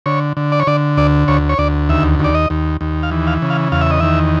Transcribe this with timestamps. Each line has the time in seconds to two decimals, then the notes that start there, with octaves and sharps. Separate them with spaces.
0.06 D3 C#5
0.37 D3
0.52 D5
0.60 C#5
0.67 D3 D5
0.97 D2 D5
1.28 D2 C#5
1.49 C#5
1.58 D2 D5
1.89 D#2 E5
2.19 D#2 D5
2.34 D#5
2.50 D#2
2.81 D#2
3.03 F5
3.11 E3
3.27 F5
3.42 C#3
3.50 F5
3.72 E2 F5
3.81 E5
3.91 D#5
4.00 D#3 E5